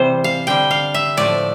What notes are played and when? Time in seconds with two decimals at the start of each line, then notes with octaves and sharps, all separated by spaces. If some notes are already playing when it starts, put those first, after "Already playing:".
Already playing: C3 E3 G3 C5
0.24 F5
0.47 D3 G3 G5
0.71 F5
0.94 E5
1.17 A2 F3 A3 D5